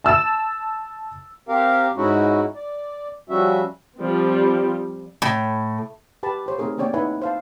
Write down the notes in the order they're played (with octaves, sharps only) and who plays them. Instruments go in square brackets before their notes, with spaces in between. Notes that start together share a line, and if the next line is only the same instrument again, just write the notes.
[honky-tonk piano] A5 E6 A6 E7
[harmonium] C4 G4 A#4 F5
G#2 G#3 C#4 D#4 E4 F#4
D5
F3 G3 C#4 F#4 E5
[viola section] F3 G3 C4
[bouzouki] A2
[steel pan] G4 B4 A5 B5
G4 C5 C#5
A3 C4 D#4 G#4 A#4 C#5
A#3 C4 C#4 C#5 D5 G5
D#4 E4 B4 E5 F#5 G#5
C5 F5 A5